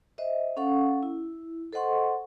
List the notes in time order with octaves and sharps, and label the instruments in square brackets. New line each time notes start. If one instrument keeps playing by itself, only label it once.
[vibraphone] C5 D#5 E5
C#4 A4 F5 F#5 C#6
E4
A4 C5 D#5 F#5 C6 C#6